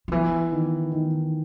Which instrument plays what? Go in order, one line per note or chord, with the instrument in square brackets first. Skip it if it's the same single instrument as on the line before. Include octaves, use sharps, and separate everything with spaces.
[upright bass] D#3
[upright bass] E3 [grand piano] B3
[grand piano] D#3
D#3